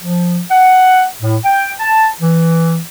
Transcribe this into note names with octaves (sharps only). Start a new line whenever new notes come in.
F3
F#5
A2
G5
A5
E3